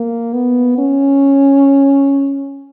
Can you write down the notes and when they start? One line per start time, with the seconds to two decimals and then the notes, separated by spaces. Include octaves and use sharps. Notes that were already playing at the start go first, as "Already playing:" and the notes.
Already playing: A#3
0.33 B3
0.78 C#4